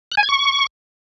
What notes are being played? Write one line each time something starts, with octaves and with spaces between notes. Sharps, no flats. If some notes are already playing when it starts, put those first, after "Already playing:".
F#6
G#5
G#6
C#6